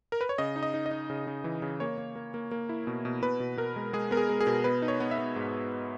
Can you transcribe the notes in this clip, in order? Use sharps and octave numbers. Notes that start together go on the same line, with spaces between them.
A#4
B4
C#5
C#3 D#5
D#4
D#5
D#4
D#5
D#4
C#3
C#3
E3
C#3
A#3 C#5
A#3
A#3
A#3
A#3
E4
B2
B2
B2 B4
B2
B2 A#4
G#3
G#3 G#4
B3 A#4
G#4
G#3
G#4
B2
B3 B4
D#4
C#5
B3
E5
B3
G#2